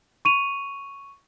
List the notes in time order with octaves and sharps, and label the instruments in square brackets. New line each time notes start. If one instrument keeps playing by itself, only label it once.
[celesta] C#6 D#7 F7